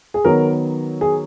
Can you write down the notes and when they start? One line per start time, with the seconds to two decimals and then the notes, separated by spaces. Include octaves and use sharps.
0.14 G#4
0.24 D#3 F#3 B3 A#4
1.01 G#4